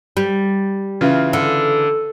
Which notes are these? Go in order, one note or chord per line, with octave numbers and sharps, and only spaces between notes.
G3
C#3 E3 F4
D3